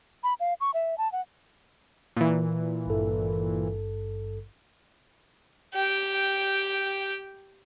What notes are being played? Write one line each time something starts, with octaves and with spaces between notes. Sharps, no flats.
B5
F5
C#6
E5
A5
F#5
A#2 E3
G#1 G2 A4
G4 G5